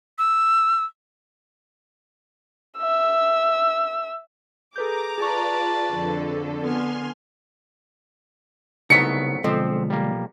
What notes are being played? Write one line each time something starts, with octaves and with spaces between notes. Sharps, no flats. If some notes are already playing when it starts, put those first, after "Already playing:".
E6
E5 E6
G#4 A4 B4 A#5 D6 G6
F4 G#4 B4 D5 A5 C#6
F2 D3 A4
B3 G#5 C6 F6
C2 C#3 F#3 A3 B3 D#4 B6 C#7
B1 D3 F3 G#3 C4 C5
G3 A#3